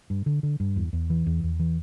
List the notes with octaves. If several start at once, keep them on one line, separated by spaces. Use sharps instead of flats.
G2
D3
D3
G2
E2
E2
E3
E2
E2
E3